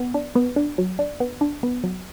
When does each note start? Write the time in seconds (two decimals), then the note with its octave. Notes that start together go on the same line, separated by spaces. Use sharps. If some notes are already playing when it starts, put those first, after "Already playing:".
Already playing: B3
0.14 D4
0.35 B3
0.56 D4
0.78 F#3
0.99 D4
1.20 B3
1.41 D4
1.63 B3
1.84 F#3